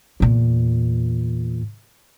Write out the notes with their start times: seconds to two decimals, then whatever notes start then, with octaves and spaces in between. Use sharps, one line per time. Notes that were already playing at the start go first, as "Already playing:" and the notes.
0.20 E2 A#2